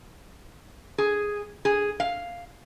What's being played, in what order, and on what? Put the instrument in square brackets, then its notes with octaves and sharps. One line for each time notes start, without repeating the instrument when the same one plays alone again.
[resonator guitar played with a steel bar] G#4
G#4
F5